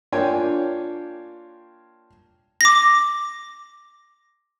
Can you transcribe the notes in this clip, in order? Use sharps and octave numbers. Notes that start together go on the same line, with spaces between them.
A#3 D4 F4 C#5 G5 G#5
D6 A#6